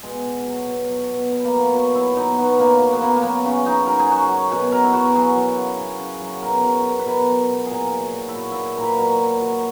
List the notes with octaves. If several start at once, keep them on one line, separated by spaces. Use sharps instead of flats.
B2 G#3
B2
F#3
B2
F#3
B2
B2 B3
A#3
F#3
B3
F#3
F#3 E4
B2 D#4
F#3 B3
C#3 A#3
F#3
B3
C#3 A#3
A#3
F#3 B3
C#3 C#4
F#3 D#4
F#3 A#4
G#4
F#3 F#4
G#4
F#3
B2 F#4
B2 A#4
E4
B2 F#4
A#4
F#3 G#4
F#3
C#3
C#3
C#3
F#3
B2 A#4
F#3
B2
B4
B2 A#4
F#3
B2
A#2 G#4 A#4
F#3
F#3
E4
A#2 F#4
A#2 E4
A#2 A#4
B4
F#3 A#4
F#3
F#3